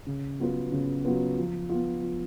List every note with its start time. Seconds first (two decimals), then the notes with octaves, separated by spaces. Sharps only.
0.07 C#3
0.39 F#3 B3 F4 B4
0.72 C#3
1.05 F#3 B3 F4 B4
1.38 F3
1.69 B3 F4
2.02 F3